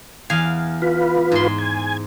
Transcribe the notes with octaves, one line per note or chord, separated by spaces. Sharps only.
E2 F5 G#5
F4 B4
G#2 C6
G#5